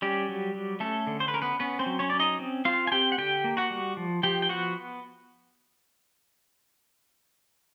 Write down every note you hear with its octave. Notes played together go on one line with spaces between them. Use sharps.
G3 C#4 G4
F#3
F#3
A3 C#4 A4
D3
C5
B4
C#4 A#4
B3 B4
B3 C#4 B4
C4 C5
F#3
C#4 C#5
C#4 D5
D#4 D#5
C4
C4 F4 F5
G#5
C4 G4 G5
F#5
D3 G4 G5
A#3
F#4 F#5
G3
F3
F3 G4 G5
G5
B3 F#4 F#5